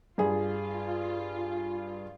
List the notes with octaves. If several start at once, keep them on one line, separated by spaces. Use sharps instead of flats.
G2 F4 G#4